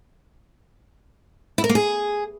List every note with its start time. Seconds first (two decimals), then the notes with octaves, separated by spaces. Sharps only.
1.58 E4
1.64 A#4
1.69 A#3
1.75 G#4